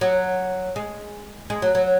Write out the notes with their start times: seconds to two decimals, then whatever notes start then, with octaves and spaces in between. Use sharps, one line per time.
0.01 F#3
0.76 G#3
1.50 G#3
1.62 F#3
1.75 F#3